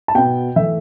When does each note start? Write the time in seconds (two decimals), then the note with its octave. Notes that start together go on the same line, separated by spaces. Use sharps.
0.08 A5
0.15 B2 B3 G5
0.56 E3 A3 E5